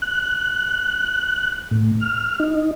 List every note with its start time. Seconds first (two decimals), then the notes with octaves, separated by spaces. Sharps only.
0.02 F#6
1.71 A2
2.00 F6
2.40 D#4